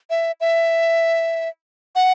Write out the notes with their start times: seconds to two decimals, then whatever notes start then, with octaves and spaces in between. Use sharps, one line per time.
0.10 E5
0.41 E5
1.95 F#5